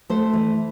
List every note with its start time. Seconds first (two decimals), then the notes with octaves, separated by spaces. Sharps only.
0.10 A3 C5
0.33 E3